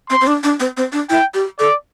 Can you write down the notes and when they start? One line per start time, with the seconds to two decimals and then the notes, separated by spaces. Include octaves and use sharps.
0.10 C4 C6
0.21 C4
0.27 D4
0.44 D4
0.60 C4
0.77 C4
0.92 D4
1.10 E4 G5
1.34 G4
1.59 A4 D5